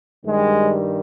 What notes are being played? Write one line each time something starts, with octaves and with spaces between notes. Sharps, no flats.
G2 D#3 G3 G#3